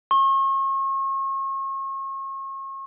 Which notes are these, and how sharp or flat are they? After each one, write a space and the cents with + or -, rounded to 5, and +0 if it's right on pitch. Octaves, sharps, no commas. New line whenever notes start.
C#6 -40